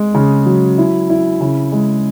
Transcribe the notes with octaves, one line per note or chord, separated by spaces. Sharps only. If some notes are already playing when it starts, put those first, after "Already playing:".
Already playing: G#3
C#3
F#3
E4
E4
C#3
G#3